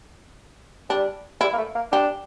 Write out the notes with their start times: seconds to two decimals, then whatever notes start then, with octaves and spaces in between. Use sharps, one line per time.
0.89 G3 D4
1.41 G3 E4
1.53 A#3
1.57 A3
1.75 A#3
1.92 D4 G4